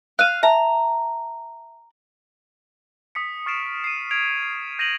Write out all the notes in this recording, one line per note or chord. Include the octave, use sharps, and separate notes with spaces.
F5 F#6 D#7
E5 A5 A#5
D#6 B6 C#7
C#6 F6 A6 C7 D7 E7
C7 D#7
G#6 D7 F7
C7
G6 A#6 D#7 F7 F#7